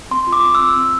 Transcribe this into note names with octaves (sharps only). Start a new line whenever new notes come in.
C4 C6
F4
D6
C4
C4 E6
C4